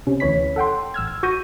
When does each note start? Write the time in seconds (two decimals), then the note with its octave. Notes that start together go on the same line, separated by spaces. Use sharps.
0.07 C3 C#4
0.20 D2 E3 C#5 B5 B6
0.56 A4 F#5 G5 C6
0.94 A1 E6 F6 G#6
1.08 G#6
1.23 F#4 C#6 G6 A#6 D#7